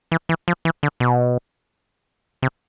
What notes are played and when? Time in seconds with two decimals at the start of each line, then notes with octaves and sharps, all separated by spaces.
0.12 E3
0.29 E3
0.48 F3
0.65 E3
0.83 D3
1.00 B2
2.42 C3